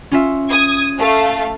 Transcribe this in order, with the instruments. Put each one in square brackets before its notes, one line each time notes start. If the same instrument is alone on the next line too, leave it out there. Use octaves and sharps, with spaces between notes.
[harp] C#4 F4 E5
[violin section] D#6 G#6
A3 F5